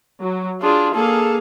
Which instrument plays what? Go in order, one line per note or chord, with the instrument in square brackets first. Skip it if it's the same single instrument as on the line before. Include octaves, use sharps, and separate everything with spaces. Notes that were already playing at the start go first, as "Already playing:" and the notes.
[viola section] F#3
[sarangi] D4 [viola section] F4 G#4
[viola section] A#3 G#4 F5 [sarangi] A4